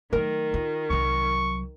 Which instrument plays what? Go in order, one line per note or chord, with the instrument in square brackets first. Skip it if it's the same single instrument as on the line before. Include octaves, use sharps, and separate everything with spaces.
[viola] D#3 [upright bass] F#3 A3 [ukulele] A#4
[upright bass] F4
[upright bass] C2 F#3 [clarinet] C#6